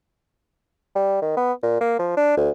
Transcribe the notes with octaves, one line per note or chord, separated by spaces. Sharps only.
G3
D#3
B3
A#2
A#3
F3
D4
D2